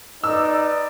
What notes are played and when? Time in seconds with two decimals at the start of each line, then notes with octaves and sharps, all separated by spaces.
0.24 D#4 B4 D5 E6